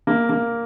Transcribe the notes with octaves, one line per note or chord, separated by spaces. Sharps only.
A#3
A#3